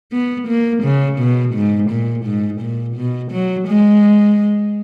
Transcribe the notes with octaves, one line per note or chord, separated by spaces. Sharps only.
B3
A#3
C#3
B2
G#2
A#2
G#2
A#2
B2
F#3
G#3